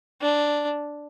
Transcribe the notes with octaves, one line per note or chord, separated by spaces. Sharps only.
D4